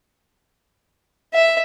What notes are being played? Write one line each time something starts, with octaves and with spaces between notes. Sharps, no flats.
E5